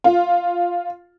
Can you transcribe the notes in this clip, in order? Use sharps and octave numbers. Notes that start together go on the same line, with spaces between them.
F4